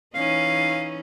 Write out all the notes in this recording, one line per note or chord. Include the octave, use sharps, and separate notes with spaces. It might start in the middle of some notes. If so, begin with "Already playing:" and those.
E3 C#4 D#4 F5